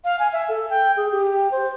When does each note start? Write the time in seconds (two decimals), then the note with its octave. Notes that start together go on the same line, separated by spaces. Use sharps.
0.05 F5
0.19 G#5
0.33 E5
0.49 A4
0.70 G5
0.97 G#4
1.12 G4
1.52 C5